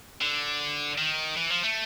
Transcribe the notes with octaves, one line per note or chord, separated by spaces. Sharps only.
D3
D#3
E3
F3
A3